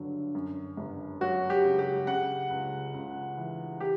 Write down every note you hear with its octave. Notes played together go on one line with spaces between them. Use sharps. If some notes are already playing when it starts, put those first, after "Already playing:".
Already playing: G1 G2 D3 F#3
F#2
G1
F#3 F#4
G4
C#3
G4
C#3 F#5
C#2
C#2
E3
G4